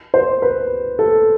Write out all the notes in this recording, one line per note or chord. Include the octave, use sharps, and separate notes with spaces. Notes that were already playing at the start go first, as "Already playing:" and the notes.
C5
B4
A4